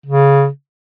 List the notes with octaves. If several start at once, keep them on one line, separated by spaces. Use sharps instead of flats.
C#3